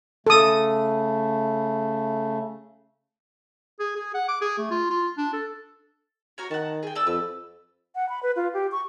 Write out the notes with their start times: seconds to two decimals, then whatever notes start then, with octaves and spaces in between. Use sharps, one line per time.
0.27 C#3 A3 A4 D#6
3.79 G#4
3.96 G#4
4.14 F#5
4.28 D6
4.41 G#4
4.58 A3
4.71 F4
4.90 F4
5.18 D4
5.33 A4
6.38 F#4 A#4 C#5
6.51 D#3 F#5 A5
6.83 G#4 G5
6.95 A4 D5 E6
7.07 F2 B4
7.95 F#5
8.09 B5
8.23 B4
8.36 F4
8.54 G4
8.72 C#6